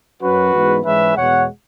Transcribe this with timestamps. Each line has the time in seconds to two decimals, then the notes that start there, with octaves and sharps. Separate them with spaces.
0.21 F#2 F#3 C#4 F#4 B4
0.53 G#2 E3 G#3 B3
0.85 G#2 E3 G#3 C#4 B4 E5
1.16 E2 B2 G#3 C#5 F#5